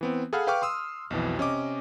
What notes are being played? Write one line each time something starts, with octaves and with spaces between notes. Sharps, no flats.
E3 B3 C4
G#4 A4 F5 F#5 B5 F6
B4 F5 G5 C#6 D6 F6
C6 D#6 E6
B1 F2 B2 E3
C3 C#4 D#5 D6